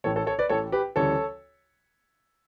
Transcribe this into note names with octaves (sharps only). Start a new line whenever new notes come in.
A1 A2 E3 A4 C#5
A4 C#5
A4 C#5
B4 D5
A1 A2 E3 A4 C#5
G4 B4
D2 C#3 E3 G3 C#4 A4 C#5